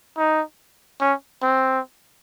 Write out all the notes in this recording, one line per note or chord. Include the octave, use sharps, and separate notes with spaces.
D#4
C#4
C4